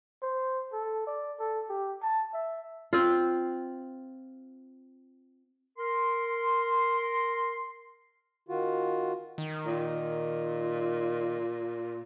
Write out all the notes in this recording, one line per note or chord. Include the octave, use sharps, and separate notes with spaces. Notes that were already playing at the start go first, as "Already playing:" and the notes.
C5
A4
D5
A4
G4
A5
E5
C4 F4
A#4 C6
D#3 F4 F#4
D#3
A#2